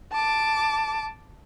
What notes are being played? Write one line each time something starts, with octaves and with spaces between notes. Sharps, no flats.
A5 D6